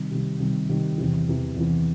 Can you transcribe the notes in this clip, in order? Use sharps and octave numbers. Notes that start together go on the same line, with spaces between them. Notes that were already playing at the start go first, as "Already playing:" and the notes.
Already playing: C3 D#3 G3
C3 D#3 G3
C3 D#3 G3
C3 D#3 G3
E2 C3 E3
E2 C3 E3
E2 C3 E3